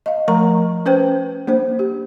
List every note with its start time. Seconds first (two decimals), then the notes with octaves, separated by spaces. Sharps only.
0.06 D#5 F5
0.28 F3 A3 A#4 A#5 C#6
0.86 C#4 B4 C5 G5
1.47 A#3 D4 C5
1.79 G4